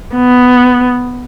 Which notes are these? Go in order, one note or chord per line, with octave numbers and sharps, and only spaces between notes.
B3